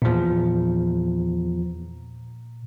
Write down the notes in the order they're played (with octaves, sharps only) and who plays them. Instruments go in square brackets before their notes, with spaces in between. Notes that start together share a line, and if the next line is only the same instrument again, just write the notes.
[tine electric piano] E2 F3 [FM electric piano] A#2